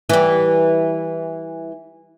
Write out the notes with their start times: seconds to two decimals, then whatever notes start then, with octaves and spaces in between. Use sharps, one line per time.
0.09 E3 G3